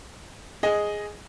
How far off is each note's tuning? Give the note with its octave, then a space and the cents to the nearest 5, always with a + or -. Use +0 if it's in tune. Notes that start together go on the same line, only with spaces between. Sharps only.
G#4 +0 D#5 +0